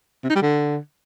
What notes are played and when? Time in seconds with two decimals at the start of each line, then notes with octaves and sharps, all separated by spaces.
0.24 C3
0.30 D#4
0.36 G3
0.42 D3